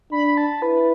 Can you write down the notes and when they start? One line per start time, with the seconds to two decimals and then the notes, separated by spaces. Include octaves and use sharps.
0.12 D4 B5
0.37 A5
0.62 E4 B4